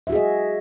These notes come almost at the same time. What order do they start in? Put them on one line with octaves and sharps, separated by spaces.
E5 F#4 G#4 D#5